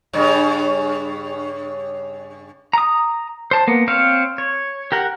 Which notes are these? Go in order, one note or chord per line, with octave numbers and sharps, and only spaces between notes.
G2 C#3
A#5 D#6
C5 A5
A#3 B3
C4 C5 C#5 F5
C#5
G4 A#4 F#5